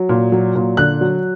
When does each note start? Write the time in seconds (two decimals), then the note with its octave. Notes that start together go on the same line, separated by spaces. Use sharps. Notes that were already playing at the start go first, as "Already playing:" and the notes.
Already playing: F#3
0.09 A#2
0.32 F#3
0.55 A#2
0.77 D3 F#6
1.01 F#3